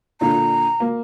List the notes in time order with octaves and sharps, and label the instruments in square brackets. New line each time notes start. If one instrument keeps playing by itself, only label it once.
[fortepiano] A#2 D3 [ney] A#5
[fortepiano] A#3